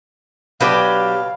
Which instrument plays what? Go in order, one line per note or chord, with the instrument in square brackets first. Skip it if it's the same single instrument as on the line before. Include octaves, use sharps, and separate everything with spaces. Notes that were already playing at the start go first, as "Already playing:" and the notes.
[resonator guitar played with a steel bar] B2 B4 D5 [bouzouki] F#3 D4 G4 [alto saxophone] F5